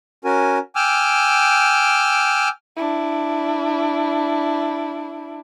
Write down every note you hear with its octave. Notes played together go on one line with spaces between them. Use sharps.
C#4 F#4 A#4 G#5
G5 G#5 D6 E6 F6
D4 E4